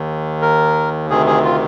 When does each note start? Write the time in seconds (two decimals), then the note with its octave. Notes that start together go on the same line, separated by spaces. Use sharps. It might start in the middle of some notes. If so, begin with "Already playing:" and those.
Already playing: D#2 D#3
0.42 A#4
1.10 D2 C3 D#3 G#4
1.27 G#4
1.45 F4